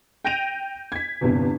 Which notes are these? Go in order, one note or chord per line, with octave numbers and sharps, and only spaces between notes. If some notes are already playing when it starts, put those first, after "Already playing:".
G5 G6 A#6 D7 D#7 F7
G#6 B6
G1 E2 G2 C3